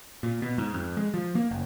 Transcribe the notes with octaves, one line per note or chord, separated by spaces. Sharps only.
A#2
B2
G#2
F2
G#3
F3
A#3
F#1